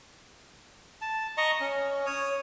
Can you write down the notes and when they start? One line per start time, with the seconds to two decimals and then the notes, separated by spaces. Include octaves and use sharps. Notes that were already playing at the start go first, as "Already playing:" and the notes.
1.02 A5
1.38 D#5 A#5 C#6
1.61 C#4
2.06 C#5 D#6